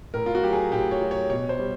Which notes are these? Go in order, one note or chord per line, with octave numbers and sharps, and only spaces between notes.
A2 A#4
F4
F#4
F#3 G4
G#4
A2 G4
C#5
F#3
C#5
B2 C#5
C5
G3